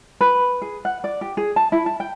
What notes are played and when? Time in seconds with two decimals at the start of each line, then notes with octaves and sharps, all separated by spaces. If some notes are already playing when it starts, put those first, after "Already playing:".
0.21 B4
0.62 G#4
0.85 F#5
1.04 D5
1.21 G4
1.37 G#4
1.56 A5
1.72 E4
1.86 A5
2.00 G5